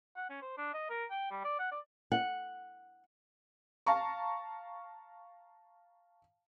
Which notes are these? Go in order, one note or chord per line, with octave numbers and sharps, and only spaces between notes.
F#5
C#4
C5
D4
D#5
A#4
G5
G3
D5
F#5
D5
F#5
F5 A5 A#5 C#6